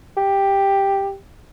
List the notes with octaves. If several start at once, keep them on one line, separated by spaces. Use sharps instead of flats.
G4